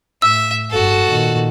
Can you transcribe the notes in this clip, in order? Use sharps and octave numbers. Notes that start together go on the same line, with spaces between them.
A2 E5 E6
F#1 G2 F#4 A4
A#2 D#3